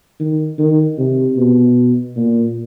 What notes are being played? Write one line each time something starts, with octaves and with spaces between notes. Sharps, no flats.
D#3
D#3
C3
B2
A#2